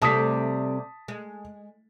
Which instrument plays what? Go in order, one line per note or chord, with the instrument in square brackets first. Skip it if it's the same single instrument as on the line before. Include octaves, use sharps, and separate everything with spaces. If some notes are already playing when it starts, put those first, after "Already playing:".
[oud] C3 G3 A3 [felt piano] A5 D#6 B6
[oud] G#3